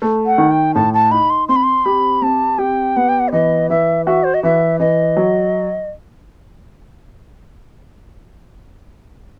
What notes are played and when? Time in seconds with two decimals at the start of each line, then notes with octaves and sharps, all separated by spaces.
0.02 A3
0.26 F#5
0.38 D#3
0.51 G5
0.74 A2 A5
0.94 A5
1.11 D#4 B5
1.30 C6
1.48 C4 C6
1.56 B5
1.63 C6
1.85 G4 B5
2.22 C4 A5
2.58 G4 G5
2.96 B3 F#5
3.09 G5
3.20 F#5
3.28 C5
3.32 E3 D#5
3.70 E3 E5
4.06 F#4 E5
4.24 C5
4.34 D#5
4.43 E3 E5
4.79 E3 D#5
5.17 F#3